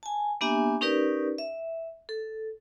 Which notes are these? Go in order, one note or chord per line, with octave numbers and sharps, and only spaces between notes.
G#5 A5
A#3 B3 D4 G4 E5 G#5
C#4 D#4 G4 A#4 B4 D5
E5
A4